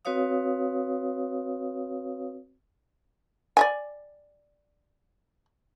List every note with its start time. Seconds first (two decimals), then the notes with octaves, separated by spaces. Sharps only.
0.05 C4 F#4 B4 C#5 F5 D#6
3.57 D5 E5 G#5